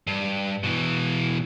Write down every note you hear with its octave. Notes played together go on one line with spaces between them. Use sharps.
G2
B2 E3